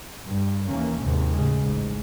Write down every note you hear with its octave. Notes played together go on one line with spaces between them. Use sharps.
G2
D#2 E3 A#3 C#4
D#2 G#2 C3
A2 C#3 G#3
A1 G#2